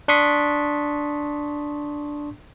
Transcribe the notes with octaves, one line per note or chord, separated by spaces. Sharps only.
D4 C6 C#6 D#6 B6